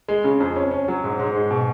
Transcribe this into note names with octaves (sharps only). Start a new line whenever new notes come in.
G#3
C#3
F2
C#4
C#4
F#3
G#2
G#2
G#3
B2